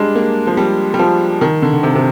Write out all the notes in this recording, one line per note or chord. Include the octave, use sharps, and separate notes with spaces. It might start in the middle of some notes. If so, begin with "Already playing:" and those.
Already playing: G3 G#3 D4
A#3
F3
G3
G3
F3
D#3
D3
D3
C3
C3